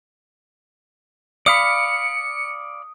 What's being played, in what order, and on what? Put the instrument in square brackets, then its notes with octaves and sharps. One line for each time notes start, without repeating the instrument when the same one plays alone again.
[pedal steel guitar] D5 F5 B5 [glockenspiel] D#6 [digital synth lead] C#7